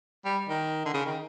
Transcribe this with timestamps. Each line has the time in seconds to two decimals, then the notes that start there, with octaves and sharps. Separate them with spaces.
0.25 G3
0.49 D#3
0.85 D3
0.94 C#3
1.06 D#3